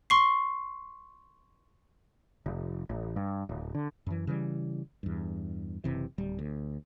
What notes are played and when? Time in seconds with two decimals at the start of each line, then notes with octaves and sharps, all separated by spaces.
0.10 C6 C#6 C7
2.46 F1
2.89 A1
3.16 G2
3.49 D1
3.75 D3
4.07 F#2 E3
4.27 C#3 E3 G3
5.03 E2 G2
5.84 F#1 C3 E3
6.18 D1 G3
6.39 D2